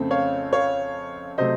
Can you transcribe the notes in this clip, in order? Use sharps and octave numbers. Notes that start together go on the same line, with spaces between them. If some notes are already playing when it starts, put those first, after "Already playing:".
Already playing: F2 C#3 A3 C4
C#5 F5
C#5 F5
C3 F#3 A3 C5 D#5